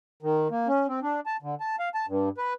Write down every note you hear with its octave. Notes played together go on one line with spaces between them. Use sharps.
D#3
A#3
C#4
C4
D4
A5
D3
A5
F5
A5
G2
B4